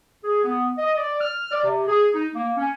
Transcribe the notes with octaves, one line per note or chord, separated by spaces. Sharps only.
G#4
B3
D#5
D5
F6
D5
C3
G#4
D#4
A#3
C#4